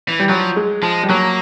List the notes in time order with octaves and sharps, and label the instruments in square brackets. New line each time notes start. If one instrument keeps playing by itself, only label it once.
[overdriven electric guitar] E3
[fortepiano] G3
[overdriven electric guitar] F3 [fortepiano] F#3
[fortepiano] G#3
[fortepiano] F3 [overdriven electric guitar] G#3
[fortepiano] G3
[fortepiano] F#3 [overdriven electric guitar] A#3